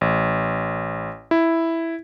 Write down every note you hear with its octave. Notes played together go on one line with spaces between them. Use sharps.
A1
E4